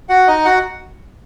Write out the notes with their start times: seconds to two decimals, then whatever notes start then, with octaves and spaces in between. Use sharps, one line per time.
0.09 F#4 F#5
0.28 D#4 D#5
0.45 F#4 F#5